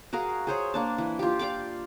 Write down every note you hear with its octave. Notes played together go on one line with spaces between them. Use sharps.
F#4 G#4 A#4 F5
G#4 C5 C#5
A#3 D4 A5
E3
F4 G4
D5 F5 G5 D6